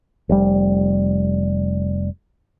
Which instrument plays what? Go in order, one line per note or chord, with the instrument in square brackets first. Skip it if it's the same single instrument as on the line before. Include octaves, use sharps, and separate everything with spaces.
[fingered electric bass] F1 G3